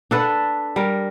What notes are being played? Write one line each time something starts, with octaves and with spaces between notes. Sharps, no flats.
D4 A4 B4 F#5
G3 A#4